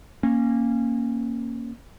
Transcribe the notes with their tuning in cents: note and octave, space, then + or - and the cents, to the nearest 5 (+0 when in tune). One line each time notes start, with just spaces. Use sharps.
A#3 +0 C#4 -15